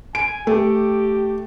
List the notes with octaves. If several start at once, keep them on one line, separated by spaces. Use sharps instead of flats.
G#5 D7
A3 G4